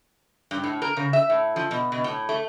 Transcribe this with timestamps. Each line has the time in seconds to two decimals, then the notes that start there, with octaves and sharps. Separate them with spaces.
0.51 G2
0.64 A2
0.82 A#4
0.97 C#3
1.13 E5
1.30 A2
1.56 F3
1.71 B2
1.92 B2
2.04 A2
2.29 A3